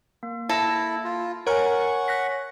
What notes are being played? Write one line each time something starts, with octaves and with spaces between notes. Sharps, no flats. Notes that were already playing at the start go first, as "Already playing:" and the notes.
A#3
E4 A4 A5 A#6
F4
A#4 C#5 F#5 G#5 A#5 C#6 F6
F#6 A#6 B6